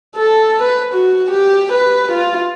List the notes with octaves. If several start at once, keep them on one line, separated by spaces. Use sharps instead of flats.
A4
B4
F#4
G4
B4
F4